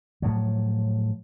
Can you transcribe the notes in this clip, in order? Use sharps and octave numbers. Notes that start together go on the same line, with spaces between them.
A2 F3 F#3